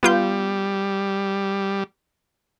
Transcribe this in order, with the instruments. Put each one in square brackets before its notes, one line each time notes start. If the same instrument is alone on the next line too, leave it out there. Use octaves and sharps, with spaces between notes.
[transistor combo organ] G3 [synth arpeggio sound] B3 F4 G6